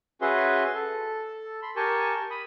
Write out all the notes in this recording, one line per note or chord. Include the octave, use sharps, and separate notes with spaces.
C#4 F#4 G#4 B4 E5 C6
A4
B5 C6
G4 A#4 G#5 A5 C#6
B5 D#6